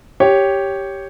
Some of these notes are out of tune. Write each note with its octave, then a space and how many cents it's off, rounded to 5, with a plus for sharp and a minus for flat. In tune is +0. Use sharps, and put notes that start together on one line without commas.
G4 +0 C#5 +0